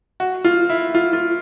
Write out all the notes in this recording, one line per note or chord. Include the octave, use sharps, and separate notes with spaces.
F#4
F4
E4
F4
F4